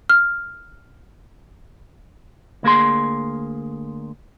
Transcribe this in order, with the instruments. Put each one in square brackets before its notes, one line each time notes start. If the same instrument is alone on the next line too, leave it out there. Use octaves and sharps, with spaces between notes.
[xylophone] F6
[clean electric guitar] D2 A#3 G#4 C6